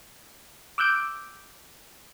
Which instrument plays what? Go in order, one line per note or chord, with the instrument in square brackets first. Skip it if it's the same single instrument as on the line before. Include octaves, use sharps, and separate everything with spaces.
[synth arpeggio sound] D6 E6 F#6 G6 D7